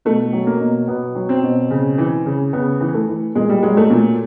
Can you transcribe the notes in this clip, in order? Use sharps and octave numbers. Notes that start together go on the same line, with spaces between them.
B2 A3
F#3
A#3
B2
B2 B3
F#3
C4
B2
C#3
E3
C#3
C#3 B3
E3
A3
E3
A#2 G#3
G3
F#3 G#3
A3
A#2